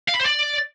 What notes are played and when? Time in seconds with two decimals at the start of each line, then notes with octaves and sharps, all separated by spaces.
0.09 F5
0.15 B5
0.21 C5
0.26 D5